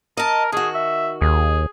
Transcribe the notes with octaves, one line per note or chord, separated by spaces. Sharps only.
A#4 D#5 A5
D#3 F#4 G#4
E5
D#2 G#4